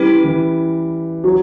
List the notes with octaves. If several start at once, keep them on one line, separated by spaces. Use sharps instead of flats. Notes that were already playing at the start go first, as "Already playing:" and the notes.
Already playing: G3 C#4 E4 B4
E3
F#3